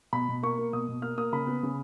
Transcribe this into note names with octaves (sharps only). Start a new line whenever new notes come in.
B2 B5
B2
A#3 C#6
A#3
B2 D#6
B2
A#3 F6
A#3 D#6
C#3 B5
B3
C#3